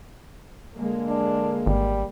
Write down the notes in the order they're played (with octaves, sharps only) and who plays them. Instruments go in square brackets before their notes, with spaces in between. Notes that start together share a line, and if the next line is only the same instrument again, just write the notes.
[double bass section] D3 G#3 A#3
[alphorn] D4
[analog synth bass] G#1 [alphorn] G3